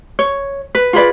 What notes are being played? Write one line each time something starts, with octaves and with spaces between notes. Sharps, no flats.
C#5
B4
F4 G#4 B4 D5